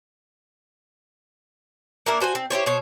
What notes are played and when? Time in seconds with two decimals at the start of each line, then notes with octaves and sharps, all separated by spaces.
2.06 A#3 D4 E4 A#4
2.20 D4 F#4 C5 G#5
2.35 C4
2.50 E4 G4 C5 C#5
2.66 B2 C5 C#5